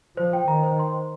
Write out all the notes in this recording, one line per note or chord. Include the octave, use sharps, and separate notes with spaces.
F3 C5
G5
D#3 A#5
C5
C6
C5